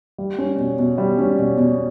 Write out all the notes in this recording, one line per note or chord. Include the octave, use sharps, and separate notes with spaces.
G3
C#4
B2
B2
G3
C#4
B2
B2